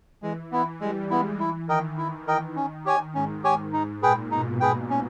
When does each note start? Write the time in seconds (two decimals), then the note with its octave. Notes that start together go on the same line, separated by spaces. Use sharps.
0.22 E3 G#3
0.52 E3 B3 E4
0.81 G3 G#3
1.10 G#3 B3 E4
1.39 E3 E4
1.68 D#3 A#4 D#5 G5
1.98 E4
2.27 A#4 D#5 G5
2.56 C#4
2.85 G4 C#5 G#5
3.14 G#2 C#4
3.44 G4 C#5 G#5
3.73 G#2 D#4
4.02 A#2 G#4 B4 G5
4.31 B2 D#4
4.60 G#4 B4 G5
4.90 C#4